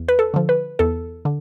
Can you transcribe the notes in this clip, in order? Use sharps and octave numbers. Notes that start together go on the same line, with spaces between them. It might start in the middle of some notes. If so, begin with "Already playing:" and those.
Already playing: E2
B4
A4
D3 F3
B4
E2 A4
D3